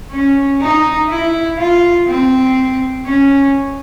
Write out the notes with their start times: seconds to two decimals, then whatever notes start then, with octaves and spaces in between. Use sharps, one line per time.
0.11 C#4
0.61 D#4
1.09 E4
1.58 F4
2.07 C4
3.05 C#4